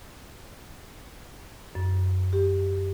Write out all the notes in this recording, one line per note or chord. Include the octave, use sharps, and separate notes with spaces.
F#2
G4